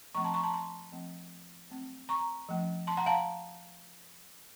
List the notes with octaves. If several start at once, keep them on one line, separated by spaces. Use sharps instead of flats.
F3 A3 C4 A#5 C#6
A5 C6
A#5 C#6
A5 C6
A5 C6
F3 A3 C4
F#3 A3 C4
A#5 C#6
F3 A3 C#4
A5 C6
F#5 A#5
F5 A5